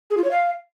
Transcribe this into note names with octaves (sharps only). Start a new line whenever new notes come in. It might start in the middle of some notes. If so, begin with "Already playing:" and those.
G#4
F4
C#5
F5